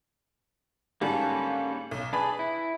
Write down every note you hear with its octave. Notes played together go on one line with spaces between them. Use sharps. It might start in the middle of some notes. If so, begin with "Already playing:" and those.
G#2 D3 G3 A#3 C#4 A4
B1
D4 G#4 B4 B5
E4